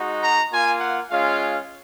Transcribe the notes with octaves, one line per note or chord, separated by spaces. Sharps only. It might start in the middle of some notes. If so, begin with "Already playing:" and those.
Already playing: G#3 D#4 F#4
A#5
A#3 F4 G#5
F#5
G#3 C#4 F4 F5